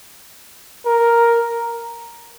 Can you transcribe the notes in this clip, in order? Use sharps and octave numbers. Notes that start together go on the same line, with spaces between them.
A#4